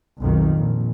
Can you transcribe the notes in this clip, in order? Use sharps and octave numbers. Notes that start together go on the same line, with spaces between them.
B1 F2 D#3
A#1